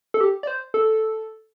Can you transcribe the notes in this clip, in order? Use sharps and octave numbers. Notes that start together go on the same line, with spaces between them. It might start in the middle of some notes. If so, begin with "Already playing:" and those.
A4
G4
D5
C5
A4